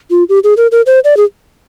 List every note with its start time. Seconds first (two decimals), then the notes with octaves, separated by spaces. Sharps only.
0.10 F4
0.29 G4
0.44 G#4
0.57 A#4
0.72 A#4
0.86 C5
1.04 D5
1.17 G#4